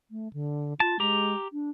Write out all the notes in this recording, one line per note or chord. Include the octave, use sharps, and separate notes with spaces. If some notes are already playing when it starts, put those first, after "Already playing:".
A3
D3
F4 A5
G#3 G4 A#5
D4